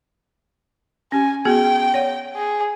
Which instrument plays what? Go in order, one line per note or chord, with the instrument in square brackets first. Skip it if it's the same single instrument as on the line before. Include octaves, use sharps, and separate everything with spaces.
[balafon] C#4 G4 [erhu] G#5
[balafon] B3 F#4 G#4 [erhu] G5
[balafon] C#5 D5 F#5
[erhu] G#4